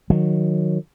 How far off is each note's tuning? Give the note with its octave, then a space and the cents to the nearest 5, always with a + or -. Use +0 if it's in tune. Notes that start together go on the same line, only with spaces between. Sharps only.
D#3 -10 F#3 -20